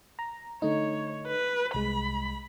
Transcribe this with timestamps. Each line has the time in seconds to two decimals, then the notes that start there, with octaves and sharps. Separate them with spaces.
0.19 A#5
0.62 D3 A3 D#4 C#5
1.27 B4
1.74 C2 G#3 B5